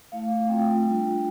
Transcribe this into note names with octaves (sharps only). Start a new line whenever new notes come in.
A3 E4 F5
A3 C4 F4 G5
G3 D4 F4